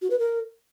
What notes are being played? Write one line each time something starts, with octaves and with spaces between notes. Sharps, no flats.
F#4
B4
A#4